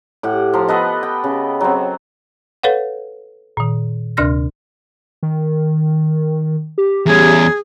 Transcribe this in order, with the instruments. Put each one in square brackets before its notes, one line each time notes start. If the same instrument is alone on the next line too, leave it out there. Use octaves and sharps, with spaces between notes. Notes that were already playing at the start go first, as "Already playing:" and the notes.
[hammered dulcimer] A2 G4 F#5
F3 A#5 C6
B3 A4 B4 D#5
G5
C#3
F#3 C4
[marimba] A4 B4 C#5 F5 F#5
A#2 D#3
D2 C3 D4 F6 F#6 A#6
[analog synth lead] D#3
G4
[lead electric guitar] E2 C#4 [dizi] G#4